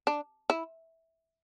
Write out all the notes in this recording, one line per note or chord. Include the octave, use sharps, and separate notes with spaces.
D4
E4